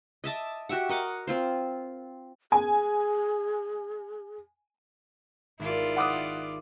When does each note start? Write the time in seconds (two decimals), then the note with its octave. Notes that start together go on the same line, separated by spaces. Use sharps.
0.24 D#5 E5 A5 D6
0.69 F#4 G4 E5 F#5
0.89 A#4 D#5 F#5 D6
1.27 C4 F4 C5
2.52 G#4 G#5
5.60 G#1 E4 F4 D5
5.97 F#5 D6 D#6